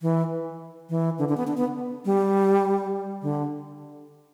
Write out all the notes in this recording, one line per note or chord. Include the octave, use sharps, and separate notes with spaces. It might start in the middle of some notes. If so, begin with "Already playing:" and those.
E3
E3
D3
D3
B3
D4
B3
G3
D3